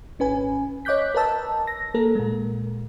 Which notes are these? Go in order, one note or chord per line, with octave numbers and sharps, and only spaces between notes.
G#1 C#4 B4 G#5
C#5 D#5 D6 F#6 G6 B6
A#4 B4 D#5 A5 E6
A#6
A#3 A4 A#4
A#2 G#3